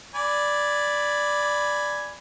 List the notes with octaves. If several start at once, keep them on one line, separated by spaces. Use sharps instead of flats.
D5 G#5 B5